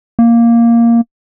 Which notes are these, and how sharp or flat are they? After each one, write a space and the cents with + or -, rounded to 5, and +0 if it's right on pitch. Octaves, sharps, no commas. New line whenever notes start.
A#3 +0